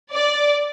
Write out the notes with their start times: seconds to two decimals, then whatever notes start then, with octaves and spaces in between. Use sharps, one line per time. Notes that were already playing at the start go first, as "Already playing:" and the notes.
0.13 D5